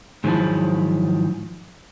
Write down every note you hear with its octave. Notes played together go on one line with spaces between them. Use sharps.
G#2 D#3 F3 F#3 E4 A5